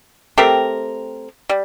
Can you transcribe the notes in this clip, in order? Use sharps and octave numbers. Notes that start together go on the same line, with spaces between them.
A3 C4 G4 A#4
G3